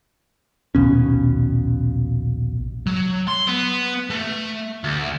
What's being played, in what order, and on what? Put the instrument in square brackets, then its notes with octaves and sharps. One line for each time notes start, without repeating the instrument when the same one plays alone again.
[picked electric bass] A#1 D#2 B2 C#4
[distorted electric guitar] F#3
C6
B3
A3
D2